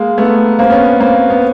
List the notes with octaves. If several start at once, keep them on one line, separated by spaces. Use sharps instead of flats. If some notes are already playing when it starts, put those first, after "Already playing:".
Already playing: G#3 A#3
A3 B3
A#3 C4
B3 C#4
A#3 C4
B3